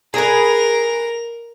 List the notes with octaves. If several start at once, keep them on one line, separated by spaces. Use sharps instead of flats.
G#4 A#4 B4 F7